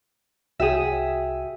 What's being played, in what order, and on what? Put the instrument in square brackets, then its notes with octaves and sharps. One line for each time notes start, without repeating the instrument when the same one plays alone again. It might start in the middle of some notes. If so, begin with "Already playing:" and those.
[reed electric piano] C2 F#4 G5 [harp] G#4 E5